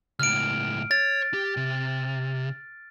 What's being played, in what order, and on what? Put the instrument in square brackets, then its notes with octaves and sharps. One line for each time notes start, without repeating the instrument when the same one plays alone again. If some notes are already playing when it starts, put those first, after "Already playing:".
[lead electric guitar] C#2 A2 [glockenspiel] F6 D7
[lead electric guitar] C#5 [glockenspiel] A6
[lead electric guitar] G4
C3